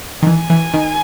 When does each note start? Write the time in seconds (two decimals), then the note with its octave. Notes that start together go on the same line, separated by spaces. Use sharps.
0.23 D#3
0.27 E3 G#5
0.50 E3
0.74 D#3